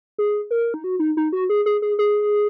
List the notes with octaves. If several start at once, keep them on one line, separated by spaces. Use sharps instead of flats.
G#4
A#4
D#4
F#4
D#4
D#4
F#4
G#4
G#4
G#4
G#4